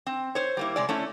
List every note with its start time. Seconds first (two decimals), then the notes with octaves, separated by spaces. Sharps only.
0.06 C4
0.35 C5 C#5
0.57 G3 A#3 E4
0.76 C3 G#3 D5
0.89 A3 C#4 E4